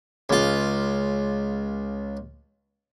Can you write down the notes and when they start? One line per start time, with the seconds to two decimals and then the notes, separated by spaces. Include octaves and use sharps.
0.30 C#2 F4